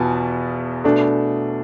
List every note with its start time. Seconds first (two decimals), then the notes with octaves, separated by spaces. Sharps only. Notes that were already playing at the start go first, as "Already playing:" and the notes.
Already playing: E2 B2 B3 F4 G#5 A5
0.84 B2 A3 D4